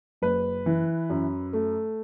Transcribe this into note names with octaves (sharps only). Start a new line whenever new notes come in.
F#1 B4
E3
F#2
A3